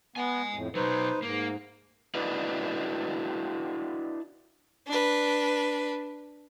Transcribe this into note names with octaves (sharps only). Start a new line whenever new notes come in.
B3 D#5 G#5
F2 A2
B2 F#3 D#4 B4 C5
G#2 A#3
D4 E4 F#4 B4 D5 D#5
D4 B4